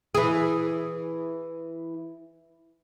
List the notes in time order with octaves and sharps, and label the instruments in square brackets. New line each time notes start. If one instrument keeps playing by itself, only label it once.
[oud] E3 G#4